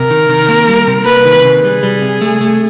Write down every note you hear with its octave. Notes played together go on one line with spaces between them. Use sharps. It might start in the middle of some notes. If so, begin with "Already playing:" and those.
Already playing: C3 A#4
D#3
D#3
A#3
G3
C3
A#3 B4
D#3
C3
G3 G#4
G3
C3
A3
A3